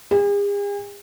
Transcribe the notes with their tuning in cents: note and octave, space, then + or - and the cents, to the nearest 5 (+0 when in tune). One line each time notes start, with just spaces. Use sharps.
G#4 -45